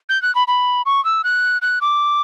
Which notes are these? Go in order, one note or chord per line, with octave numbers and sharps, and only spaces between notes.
G6
F#6
B5
B5
C#6
E6
F#6
F#6
D6